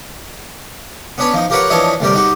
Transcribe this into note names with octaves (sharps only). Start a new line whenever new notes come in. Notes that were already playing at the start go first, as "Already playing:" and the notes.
B3 C#4 D4 B4 C#5
F3 D#4
F4 G4 A#4 B4 C#5 F#5
E3 F3 D4 C#5 D#5 E5
D2 C3 G3 G4 A#4
D#4 F#4 G4